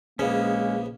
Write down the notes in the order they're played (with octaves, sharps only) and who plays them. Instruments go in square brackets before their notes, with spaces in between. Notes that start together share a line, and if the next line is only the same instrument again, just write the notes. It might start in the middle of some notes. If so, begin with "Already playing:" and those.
[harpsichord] A#1 C#3 B3 [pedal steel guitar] G#3 C#4 [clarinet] A#3